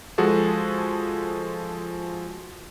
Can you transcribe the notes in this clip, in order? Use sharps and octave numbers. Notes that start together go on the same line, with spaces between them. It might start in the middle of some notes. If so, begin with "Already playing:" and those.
F3 G#3 F#4 G#4 A4